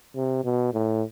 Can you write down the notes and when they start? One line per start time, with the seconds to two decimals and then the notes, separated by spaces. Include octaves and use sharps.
0.16 C3
0.44 B2
0.73 A2